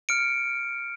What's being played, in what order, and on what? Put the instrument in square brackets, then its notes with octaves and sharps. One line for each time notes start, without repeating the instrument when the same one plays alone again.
[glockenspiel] F6 C#7 D7